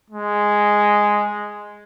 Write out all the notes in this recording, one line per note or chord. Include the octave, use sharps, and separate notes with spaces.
G#3